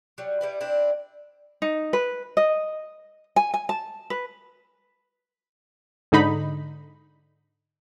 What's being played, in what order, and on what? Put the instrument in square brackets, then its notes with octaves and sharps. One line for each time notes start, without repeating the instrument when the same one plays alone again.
[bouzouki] F#3 G3
G3 E4 B4
C4 D4 E4
[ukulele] D#4
B4
D#5
G#5
G#5
A5
B4
[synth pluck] G#2 D3 D#4 B5